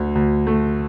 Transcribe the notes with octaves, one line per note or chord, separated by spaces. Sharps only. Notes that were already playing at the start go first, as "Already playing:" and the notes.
Already playing: D2 D3
D2
A3